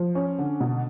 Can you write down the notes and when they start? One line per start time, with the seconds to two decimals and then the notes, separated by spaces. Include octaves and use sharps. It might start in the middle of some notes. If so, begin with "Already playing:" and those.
Already playing: F3
0.15 C#4
0.39 D3
0.60 B2